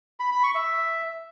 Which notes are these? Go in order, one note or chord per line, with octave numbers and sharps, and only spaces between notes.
B5
B5
C#6
E5